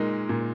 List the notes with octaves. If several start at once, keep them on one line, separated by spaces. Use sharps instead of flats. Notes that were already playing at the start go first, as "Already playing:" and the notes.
Already playing: A#2 G#3 D#4 A#4
A#2